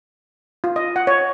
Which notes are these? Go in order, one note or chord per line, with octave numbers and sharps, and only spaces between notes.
F4
D#5
F#5
C#5